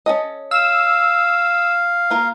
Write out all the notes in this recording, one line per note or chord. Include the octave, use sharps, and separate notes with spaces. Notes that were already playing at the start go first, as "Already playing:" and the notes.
C#4 A4 D#5
F5 E6
A#3 F4 A#4